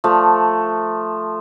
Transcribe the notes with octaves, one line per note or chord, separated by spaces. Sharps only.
F3 A3